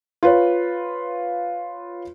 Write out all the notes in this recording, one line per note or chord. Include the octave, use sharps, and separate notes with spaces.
F4 B4 C#5